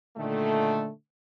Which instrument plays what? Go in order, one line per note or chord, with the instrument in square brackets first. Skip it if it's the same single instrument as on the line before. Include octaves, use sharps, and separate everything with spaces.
[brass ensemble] A#2 D3 D#3 A3